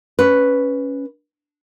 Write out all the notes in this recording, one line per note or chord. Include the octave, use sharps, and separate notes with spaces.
C#4 B4